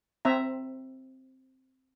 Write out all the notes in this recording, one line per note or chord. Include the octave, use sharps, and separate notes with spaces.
C4 E5 A#5